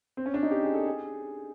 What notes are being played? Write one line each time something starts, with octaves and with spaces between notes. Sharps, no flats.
C4
C#4
D4
D#4
G4
G#4
A4
G#4